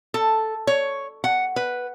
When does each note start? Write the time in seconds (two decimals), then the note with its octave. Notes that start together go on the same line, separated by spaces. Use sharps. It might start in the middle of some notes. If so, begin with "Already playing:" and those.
0.14 A4
0.67 C#5
1.24 F#5
1.56 B4